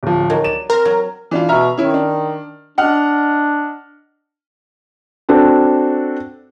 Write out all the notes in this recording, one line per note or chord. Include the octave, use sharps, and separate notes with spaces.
D1 F3
D#3 F#3
D5 E7
C4 A#4
F#3
E3 D4 F4
B2 E5 A#5 F6
D#3 C#4 E4
D4
D4 D#5 F#5 F6
C4 D4 F#4 A4